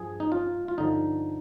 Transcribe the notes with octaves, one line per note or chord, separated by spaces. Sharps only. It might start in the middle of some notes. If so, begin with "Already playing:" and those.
Already playing: G2 F3 G#4
D#4
F4
F4
G2 D3 F3 D#4